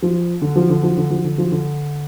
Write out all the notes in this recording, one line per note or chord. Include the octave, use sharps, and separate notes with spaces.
F3
D3
F3
D3
F3
D3
F3
D3
F3
D3